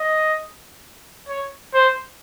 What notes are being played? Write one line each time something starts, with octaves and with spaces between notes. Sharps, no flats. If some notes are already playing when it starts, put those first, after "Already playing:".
Already playing: D#5
C#5
C5